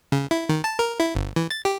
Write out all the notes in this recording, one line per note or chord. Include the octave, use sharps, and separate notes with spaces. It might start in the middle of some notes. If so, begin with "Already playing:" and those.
C#3
E4
D#3
A5
A#4
E4
G1
E3
A6
G4